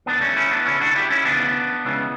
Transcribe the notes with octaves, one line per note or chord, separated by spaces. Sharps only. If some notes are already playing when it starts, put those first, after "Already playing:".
E2 D3 B3 D4
A3 C#4
C#4 E4
B3 D4
D2 C#3 E3 C#4 E4
D4 F#4
A4
E4 G4
C#4 E4
D2 C#3 E3 B3 D4
C#2 C#3 E3